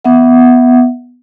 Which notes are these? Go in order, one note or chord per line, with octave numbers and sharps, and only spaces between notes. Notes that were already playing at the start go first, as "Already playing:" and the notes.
B3 E5 F#5